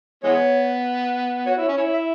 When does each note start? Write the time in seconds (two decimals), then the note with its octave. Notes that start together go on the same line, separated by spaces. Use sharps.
0.23 E3 G#3 B3 C#5
1.46 F#4 C#5
1.57 E4
1.62 C#5
1.68 C#4
1.77 E4 C#5
1.94 E5